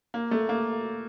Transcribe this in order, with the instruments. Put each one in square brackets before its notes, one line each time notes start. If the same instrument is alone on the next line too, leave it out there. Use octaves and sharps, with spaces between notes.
[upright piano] A#3
A3
A#3